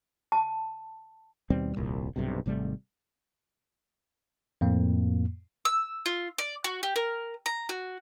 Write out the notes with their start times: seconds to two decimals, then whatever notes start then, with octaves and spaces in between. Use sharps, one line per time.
0.32 A5
1.50 D#2 B2 G3 C4
1.76 D#1 C2 A#2
2.16 B1 G2 C3
2.46 G#1 C3 G3 A3
4.61 F2 A2 A#3
5.65 E6
6.06 F4
6.38 D5
6.64 F#4
6.83 G4
6.96 A#4
7.46 A#5
7.69 F#4